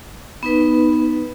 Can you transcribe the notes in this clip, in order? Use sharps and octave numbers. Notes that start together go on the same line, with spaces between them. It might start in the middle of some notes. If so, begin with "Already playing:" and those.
B3 D#4 B4